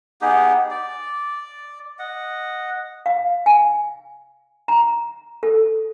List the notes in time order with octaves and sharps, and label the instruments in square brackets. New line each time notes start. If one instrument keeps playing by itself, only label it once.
[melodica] B3 D#4 G4 G#4
D5
D#5 F#5
[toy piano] F5
G#5
A#5
A4